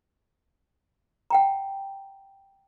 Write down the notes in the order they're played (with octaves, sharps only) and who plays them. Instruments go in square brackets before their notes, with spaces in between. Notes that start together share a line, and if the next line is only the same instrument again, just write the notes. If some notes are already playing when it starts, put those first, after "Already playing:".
[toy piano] F#5 G5 A#5